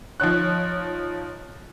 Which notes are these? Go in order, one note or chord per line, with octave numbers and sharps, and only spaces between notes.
F3 D#4 C#5 F#6